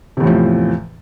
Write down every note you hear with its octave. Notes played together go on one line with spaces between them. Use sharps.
E2 A2 C3 F3